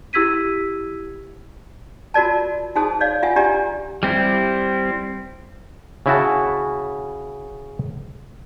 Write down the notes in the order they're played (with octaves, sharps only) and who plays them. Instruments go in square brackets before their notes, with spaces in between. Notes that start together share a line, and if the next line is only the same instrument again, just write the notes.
[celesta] E4 G4 E6 G#6 B6 D#7
[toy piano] F4 F#4 A#4 D5 A5
D#4 F#4 G#4 C5 A5 D#6
C#5 D5 F5
F4 E5 F#5 G#5
D4 G4 D5 G#5 A#5 C#6
[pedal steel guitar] G3 C4 E4
[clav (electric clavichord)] C#3 E4 F#4 A5